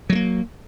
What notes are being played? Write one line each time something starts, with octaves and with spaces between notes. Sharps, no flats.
F#3 G#3 A#3